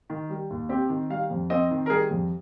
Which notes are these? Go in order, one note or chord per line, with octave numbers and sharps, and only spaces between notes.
D#3
G3
D#2
C4 G4
D#3
G3 F5
F2
C4 D#5
D#3
A#4
G3 G#4
F2